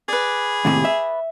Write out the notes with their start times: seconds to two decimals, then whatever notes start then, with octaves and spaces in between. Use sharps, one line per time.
0.08 G#4 B4 D5
0.65 D#2 A2 C3
0.85 E5